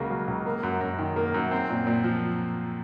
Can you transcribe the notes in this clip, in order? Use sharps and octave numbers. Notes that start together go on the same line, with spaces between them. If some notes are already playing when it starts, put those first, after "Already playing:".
Already playing: C#2 C#3 F#3 A#3
F#3
C#2
A#3
F#2
F#2
D#3
A#3
F#2
C4
A#2
A#2
F3